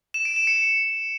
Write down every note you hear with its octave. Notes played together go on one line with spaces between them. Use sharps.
E7
D7
E7
C#7